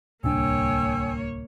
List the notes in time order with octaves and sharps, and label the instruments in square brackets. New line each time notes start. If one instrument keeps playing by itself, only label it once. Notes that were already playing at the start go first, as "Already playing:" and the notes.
[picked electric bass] D1 C2 D4 [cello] A#3 C#5 [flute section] G5 G#5 E6